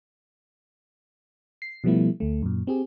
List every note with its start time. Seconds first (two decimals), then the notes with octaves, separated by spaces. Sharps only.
1.62 C7
1.84 B2 F3 G3 A3 B3 E4
2.20 D2 A3
2.42 F#2 A#2
2.67 C4 G4 G#4